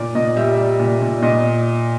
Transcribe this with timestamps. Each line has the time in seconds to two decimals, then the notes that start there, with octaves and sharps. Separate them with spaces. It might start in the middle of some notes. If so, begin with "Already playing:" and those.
Already playing: A#2 D5
0.15 A#2 D#5
0.36 G3 E5
0.57 G3
0.80 A#2
1.02 A#2
1.22 A#2 D#5